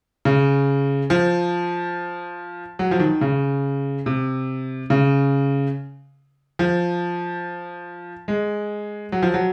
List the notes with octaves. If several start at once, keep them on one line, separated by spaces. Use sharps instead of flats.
C#3
F3
F#3
F3
D#3
C#3
C3
C#3
F3
G#3
F#3
F3
F#3